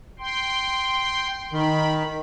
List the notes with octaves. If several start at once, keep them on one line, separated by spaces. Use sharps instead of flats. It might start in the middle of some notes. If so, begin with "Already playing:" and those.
G5 C6
D#3 B5